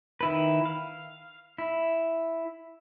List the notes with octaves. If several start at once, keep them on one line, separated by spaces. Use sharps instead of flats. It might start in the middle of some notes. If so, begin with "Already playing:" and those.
D#3 E4 B4
F5
E4